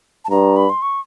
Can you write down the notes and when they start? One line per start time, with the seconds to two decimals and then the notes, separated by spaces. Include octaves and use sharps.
0.25 A5
0.30 G2 A#5
0.56 B5
0.70 C6
0.82 C#6